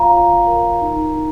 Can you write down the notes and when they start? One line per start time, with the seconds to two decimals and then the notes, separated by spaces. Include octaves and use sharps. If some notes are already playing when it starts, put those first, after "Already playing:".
Already playing: F4 C#5 F5 A#5
0.12 F4
0.47 A#4
0.81 D#4
1.16 D#4